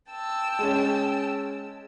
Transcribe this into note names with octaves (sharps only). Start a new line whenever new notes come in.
G5 A5 E6
G#3 C#4